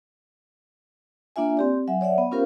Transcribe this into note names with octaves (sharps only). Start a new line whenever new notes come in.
A#3 D4 F4 E5 G#5
C4 G4 D5
F#3 E5 F#5 G#5
C#5 D5 E5 F#5
B3
C#4 F4 G4 A#4 C5 F5